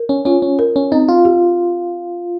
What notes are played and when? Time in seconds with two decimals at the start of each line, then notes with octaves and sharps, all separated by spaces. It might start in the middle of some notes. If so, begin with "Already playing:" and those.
Already playing: A#4
0.09 C#4
0.25 C#4 F4
0.42 C#4
0.59 A#4
0.76 C#4
0.92 C4 D#4
1.08 F4
1.25 G4